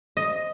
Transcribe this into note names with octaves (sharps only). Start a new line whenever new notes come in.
D#5